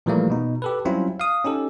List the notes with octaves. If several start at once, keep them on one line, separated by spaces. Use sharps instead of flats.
A#2 E3 F3 G3 A3 A#3
B2 D#4
G4 A4 B4
F#3 G3 C4 C#4 E4 F4
F5 D#6
C#4 D#4 G4 A4